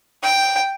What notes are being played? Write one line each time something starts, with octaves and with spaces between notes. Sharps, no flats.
G5